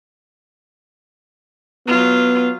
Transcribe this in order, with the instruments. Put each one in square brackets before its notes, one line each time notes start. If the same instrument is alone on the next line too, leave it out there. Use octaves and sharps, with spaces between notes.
[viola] F#3 F4 [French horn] B3